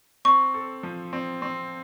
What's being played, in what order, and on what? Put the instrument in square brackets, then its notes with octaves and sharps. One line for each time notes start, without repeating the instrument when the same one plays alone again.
[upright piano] C4 [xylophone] C#6
[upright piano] A4
F3
C4
C4